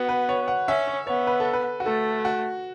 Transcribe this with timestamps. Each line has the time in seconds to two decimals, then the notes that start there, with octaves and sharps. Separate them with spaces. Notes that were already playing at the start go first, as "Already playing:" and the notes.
Already playing: B3 F#4
0.09 B4
0.29 C#5
0.48 F#5
0.68 C#4 E5
0.88 C#5
1.07 B3 C#5
1.27 B4
1.40 A4
1.53 B4
1.80 F#4
1.86 A3 A4
2.25 F#4